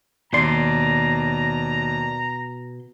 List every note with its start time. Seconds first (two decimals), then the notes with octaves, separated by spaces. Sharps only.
0.33 D#2 B2 D5 A#5 C6